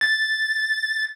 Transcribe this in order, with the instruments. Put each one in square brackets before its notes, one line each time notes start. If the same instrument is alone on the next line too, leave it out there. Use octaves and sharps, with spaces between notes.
[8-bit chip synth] A6